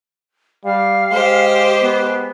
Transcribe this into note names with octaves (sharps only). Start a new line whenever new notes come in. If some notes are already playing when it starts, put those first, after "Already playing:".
G3 F5
G#3 G4 C5
B3